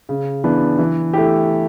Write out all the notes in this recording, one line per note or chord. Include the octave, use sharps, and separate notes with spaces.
C#3
E3 B3 D4
E3
A3 E4 G4